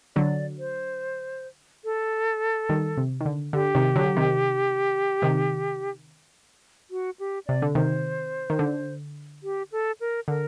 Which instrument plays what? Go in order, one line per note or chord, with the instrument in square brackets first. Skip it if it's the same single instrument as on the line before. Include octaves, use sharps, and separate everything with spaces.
[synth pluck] D3 F#3 [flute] D5
[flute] C5
A4
[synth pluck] D#3 G3
C3
D#3
D3
[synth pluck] D3 [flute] G4
[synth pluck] C3 D#3
D3 F#3
C3 D#3
C3 D#3
[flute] F#4
G4
[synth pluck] C3 [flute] D5
[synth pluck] D3
[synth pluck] C3 D#3 [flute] C5
[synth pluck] D#3
D3
[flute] G4
A4
A#4
[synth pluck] D3 [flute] A#4